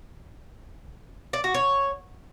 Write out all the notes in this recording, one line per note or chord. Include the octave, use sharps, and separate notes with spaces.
D5
F#4
C#5